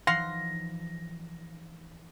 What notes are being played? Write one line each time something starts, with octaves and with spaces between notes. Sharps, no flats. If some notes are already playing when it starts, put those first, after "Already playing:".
E3 F3 D#4 F5 F#5 C6 A#6